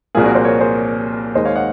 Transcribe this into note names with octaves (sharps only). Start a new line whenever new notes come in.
C2 A#2 F3 A#3 F4 G#4
F#4 A#4
G#4 C5
A#4 C#5
G#4 C5
D#2 D#3 G#3 C5 D#5
C#5 F5
D#5 F#5